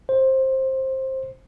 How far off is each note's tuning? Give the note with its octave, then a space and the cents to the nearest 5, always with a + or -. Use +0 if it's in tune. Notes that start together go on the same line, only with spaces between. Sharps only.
C5 +15